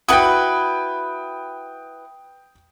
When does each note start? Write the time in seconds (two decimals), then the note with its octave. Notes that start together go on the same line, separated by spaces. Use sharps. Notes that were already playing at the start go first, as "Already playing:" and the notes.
0.08 E4 F#4 B4 G5 D#6